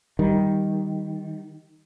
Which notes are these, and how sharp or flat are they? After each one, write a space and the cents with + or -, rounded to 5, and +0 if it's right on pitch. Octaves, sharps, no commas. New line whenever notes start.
D#3 +10 G3 +0